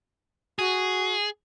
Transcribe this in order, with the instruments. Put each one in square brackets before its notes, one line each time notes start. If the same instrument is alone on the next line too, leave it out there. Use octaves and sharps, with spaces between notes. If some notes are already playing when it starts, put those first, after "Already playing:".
[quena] F#4 [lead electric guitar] G#4